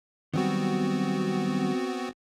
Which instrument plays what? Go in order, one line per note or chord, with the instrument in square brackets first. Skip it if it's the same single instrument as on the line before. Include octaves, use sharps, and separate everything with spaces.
[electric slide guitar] D#3 F#3 G3 [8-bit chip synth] B3 C4 F#4